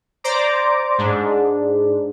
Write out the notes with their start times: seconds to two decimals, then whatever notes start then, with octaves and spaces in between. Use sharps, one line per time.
0.24 C5 D5 A#5 D6
0.98 G#2 D4